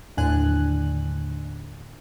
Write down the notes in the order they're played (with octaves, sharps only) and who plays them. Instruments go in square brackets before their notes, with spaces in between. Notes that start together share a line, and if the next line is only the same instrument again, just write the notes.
[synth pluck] D#2 A2 D3 D4 G#5 F#6